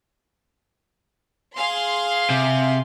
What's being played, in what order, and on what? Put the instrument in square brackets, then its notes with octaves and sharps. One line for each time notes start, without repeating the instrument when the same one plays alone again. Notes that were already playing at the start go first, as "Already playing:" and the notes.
[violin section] G#4 F5 C6
[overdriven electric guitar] C3